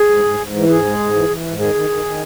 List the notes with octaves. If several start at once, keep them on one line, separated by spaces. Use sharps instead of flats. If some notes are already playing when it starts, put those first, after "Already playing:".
Already playing: G#4
G#2
G#2
G#2
E3
G#2 G#4
G#3
G#2
E3
E3
G#2
D#3 G#4
D#3
D#3
D#3